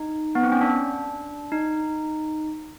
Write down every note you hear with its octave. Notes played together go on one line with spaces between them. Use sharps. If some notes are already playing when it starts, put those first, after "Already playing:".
Already playing: D#4
B3
C4
C#4
D4
D#4